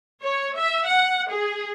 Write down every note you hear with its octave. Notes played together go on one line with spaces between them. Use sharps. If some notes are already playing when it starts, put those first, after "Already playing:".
C#5
E5
F#5
G#4